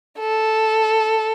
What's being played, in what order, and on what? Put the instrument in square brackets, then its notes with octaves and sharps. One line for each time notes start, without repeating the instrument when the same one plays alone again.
[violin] A4